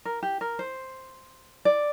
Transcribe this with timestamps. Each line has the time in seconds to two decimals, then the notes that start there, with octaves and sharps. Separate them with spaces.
0.05 A#4
0.23 G4
0.41 A#4
0.59 C5
1.65 D5